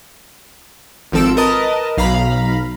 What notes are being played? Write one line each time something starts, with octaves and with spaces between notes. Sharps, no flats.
G#1 F3 C4 A4 E6 D7
A#4 B4 D#5 A5
B1 F5 A#5 B5